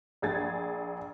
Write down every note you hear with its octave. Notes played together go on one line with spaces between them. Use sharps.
A#1 G#4 G#6 A6